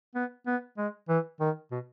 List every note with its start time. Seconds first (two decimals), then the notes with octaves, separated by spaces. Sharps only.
0.15 B3
0.47 B3
0.78 G#3
1.09 E3
1.40 D#3
1.71 B2